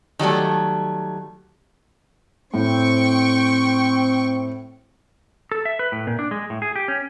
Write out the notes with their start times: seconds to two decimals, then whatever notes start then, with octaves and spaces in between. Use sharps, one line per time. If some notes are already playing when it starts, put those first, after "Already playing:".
0.19 D#3 F#3 G3 A3
2.54 A2 C4 G5 C#6
5.52 A4
5.65 E5
5.79 B4
5.92 A2
6.07 A#2
6.19 D4
6.31 G#3
6.50 A2
6.62 G#4
6.76 G4
6.88 C#4